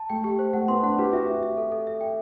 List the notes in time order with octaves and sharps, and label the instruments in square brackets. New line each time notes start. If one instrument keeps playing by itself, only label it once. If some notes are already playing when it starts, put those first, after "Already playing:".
Already playing: [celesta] A5
[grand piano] A3 [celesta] G5
[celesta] G4
C5
[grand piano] A3 [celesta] F#5
[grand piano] B3 [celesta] C6
[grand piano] D4 [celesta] F#5
[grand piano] G4 [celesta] B4
[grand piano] F#4 [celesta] E5
[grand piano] F#4 [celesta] E5
[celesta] E5
A4
A4
E5
G5